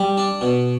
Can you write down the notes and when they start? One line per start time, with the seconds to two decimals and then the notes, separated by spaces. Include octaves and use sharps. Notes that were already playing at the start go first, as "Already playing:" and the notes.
Already playing: G3
0.17 D4
0.41 B2